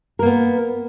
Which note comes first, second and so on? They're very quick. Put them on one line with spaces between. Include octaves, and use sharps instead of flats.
A#4 A#3 B3